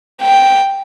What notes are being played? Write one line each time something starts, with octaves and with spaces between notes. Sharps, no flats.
G5